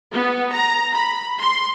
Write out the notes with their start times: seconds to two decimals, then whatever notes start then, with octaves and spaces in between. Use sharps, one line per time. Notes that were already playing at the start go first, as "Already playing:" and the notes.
0.12 B3
0.52 A#5
0.94 B5
1.40 C6